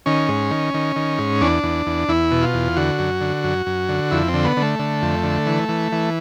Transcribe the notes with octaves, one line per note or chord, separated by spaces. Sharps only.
D#3 C#4
G#2
D#3
D#3
D#3
G#2
E2 D4
E2
E2
E2 E4
B2
F4
E2
D3 F#4
F#2
D3
F#2
F#2
D3
F2 E4
C4
D3
B3
D3
A3
D3
F2
D3
E3
E3
E3